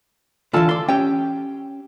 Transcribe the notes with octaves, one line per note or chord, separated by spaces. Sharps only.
D3 E3 F4 A4 A5
A4 D5 C6
C#4 G4 G5